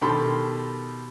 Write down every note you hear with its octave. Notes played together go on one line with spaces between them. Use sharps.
B2 D#3 G4 A4 B5 C6